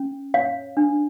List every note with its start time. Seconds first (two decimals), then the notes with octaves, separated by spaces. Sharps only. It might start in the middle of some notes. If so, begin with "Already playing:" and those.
Already playing: C#4
0.34 C#5 F5
0.77 D4